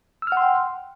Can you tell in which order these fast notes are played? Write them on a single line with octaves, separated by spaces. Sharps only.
E6 F6 F#5 C6 G5